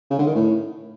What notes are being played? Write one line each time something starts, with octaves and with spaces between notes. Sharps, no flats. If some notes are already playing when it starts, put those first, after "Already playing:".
C#3
D3
D#3
A2